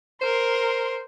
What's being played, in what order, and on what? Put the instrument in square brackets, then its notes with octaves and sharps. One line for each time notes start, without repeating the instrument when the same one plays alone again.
[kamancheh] A#4 C6 [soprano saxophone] C5